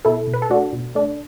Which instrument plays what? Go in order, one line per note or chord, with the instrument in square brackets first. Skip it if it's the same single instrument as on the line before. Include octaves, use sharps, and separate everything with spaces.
[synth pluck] B2 E4 A4
B2
B4
A4
A3 D4 F#4
B2
A3 D4